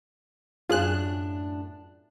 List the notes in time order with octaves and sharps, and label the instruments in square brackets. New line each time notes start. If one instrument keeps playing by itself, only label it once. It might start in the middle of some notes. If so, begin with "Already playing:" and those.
[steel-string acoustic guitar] F#2 A2 D4 [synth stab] F4 G#4 F#6